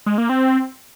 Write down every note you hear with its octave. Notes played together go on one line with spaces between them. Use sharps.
G#3
A#3
C4